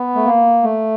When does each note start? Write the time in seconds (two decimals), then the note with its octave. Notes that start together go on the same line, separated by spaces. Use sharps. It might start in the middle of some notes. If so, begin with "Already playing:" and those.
Already playing: B3
0.15 A3
0.26 A#3
0.63 A3